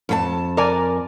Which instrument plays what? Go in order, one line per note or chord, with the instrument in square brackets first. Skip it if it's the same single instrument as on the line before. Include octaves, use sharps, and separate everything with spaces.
[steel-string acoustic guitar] F2 F4 A5
[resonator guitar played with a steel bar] A#4 D5 G#5